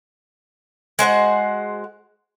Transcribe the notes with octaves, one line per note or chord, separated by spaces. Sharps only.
G#3 F#4 C5 F#5